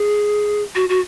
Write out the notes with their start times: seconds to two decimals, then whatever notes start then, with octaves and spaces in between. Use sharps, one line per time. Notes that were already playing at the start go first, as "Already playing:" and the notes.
Already playing: G#4
0.75 F#4
0.89 F#4